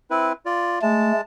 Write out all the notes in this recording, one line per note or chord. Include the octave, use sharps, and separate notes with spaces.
C4 E4 B4
F4 D5
G#3 A3 A5